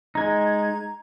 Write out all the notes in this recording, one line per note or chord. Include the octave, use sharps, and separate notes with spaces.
G#3 D#4 A#5 G#6